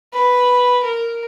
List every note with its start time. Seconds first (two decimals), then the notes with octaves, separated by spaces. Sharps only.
0.13 B4
0.83 A#4